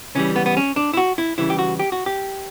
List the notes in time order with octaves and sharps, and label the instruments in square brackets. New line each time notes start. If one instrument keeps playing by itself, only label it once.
[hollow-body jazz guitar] C#3 E3 G3 C#4
B3
B3
C#4
D4
E4
F#4
E4
C#3 E3 G3 E4
G4
F#4
G4
F#4
G4